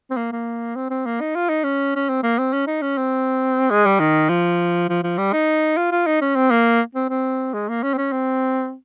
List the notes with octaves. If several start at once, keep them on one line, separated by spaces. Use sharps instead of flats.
C4
A#3
A#3
C4
C4
A#3
D#4
F4
D#4
C#4
C#4
C4
A#3
C4
C#4
D#4
C#4
C4
G#3
G3
D#3
F3
F3
F3
G3
D#4
F4
F4
D#4
C#4
C4
A#3
C4
C4
G#3
A#3
C#4
C4
C#4
C4